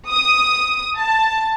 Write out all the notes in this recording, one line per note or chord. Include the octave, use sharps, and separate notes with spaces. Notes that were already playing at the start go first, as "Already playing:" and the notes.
D#6
A5